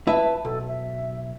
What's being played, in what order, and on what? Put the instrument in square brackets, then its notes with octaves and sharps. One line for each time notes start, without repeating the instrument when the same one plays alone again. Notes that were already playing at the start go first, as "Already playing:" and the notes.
[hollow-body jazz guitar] E4 B4 E5 [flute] A5
[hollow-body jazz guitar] B1 [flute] A4
[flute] E5